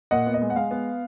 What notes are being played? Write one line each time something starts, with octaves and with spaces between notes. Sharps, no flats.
A#2 D#5 F#5
B3
D#5
G#3
F#5
G#3 F5
B3